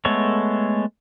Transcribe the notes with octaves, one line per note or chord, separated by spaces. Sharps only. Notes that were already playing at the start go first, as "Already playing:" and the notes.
G#3 A3 B3 A4 C#5